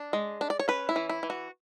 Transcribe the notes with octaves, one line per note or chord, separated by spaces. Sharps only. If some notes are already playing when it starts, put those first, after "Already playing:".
Already playing: D4
G#3
D4
D5
C#5
C#4 B4
E4
E3
E4
E3
F#4